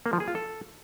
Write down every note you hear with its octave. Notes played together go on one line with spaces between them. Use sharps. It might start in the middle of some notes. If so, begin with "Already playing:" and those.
A#3
F3
G#4
F4
A4